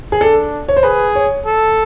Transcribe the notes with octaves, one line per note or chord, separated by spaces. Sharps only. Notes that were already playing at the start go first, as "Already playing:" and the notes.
G#4
D4 A4
C#5
C5
G#4 B4
C#5
A4